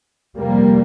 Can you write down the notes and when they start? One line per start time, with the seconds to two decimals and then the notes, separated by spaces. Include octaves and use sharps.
0.37 F2 C3 G3 A#3